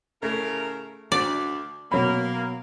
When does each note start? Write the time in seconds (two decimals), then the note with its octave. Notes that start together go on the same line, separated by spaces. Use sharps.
0.23 A2 C#3 A3 A#4
1.12 D2 D5
1.92 B2 F#3 A#3 B5